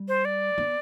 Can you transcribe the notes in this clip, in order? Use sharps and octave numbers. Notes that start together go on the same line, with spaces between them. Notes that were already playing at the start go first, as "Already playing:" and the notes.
Already playing: G3
C5
D5
B3